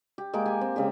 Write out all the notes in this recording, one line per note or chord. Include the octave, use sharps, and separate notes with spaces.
G4
G#3 A#3 G4 D6
G4 G#5
C4
C#3 G#3 G4